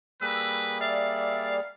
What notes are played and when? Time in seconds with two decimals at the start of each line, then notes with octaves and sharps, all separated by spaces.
0.21 G3 A#3 G#4 B4 E6
0.81 D5 E5 F5